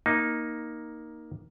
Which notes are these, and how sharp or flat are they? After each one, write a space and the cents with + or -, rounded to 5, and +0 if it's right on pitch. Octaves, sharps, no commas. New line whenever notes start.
A#3 +10 D#4 +0